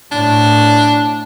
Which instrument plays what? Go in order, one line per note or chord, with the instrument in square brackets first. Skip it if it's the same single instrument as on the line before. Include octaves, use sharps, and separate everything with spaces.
[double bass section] A2 [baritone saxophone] D4